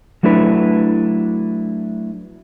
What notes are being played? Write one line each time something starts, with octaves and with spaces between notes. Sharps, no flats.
F#3 A3 D4 E4 B4